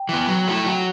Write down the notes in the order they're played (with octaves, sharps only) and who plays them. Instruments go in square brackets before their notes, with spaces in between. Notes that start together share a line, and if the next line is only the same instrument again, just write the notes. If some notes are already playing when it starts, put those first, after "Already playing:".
Already playing: [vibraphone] G5
[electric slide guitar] E3 B3
F#3
A3 E4
[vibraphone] G5
[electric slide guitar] F#3 [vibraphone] F#5